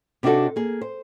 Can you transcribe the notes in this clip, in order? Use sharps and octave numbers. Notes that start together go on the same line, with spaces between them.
C3 B3 D4 D#4 F#4 A4
A#3 G#4
C5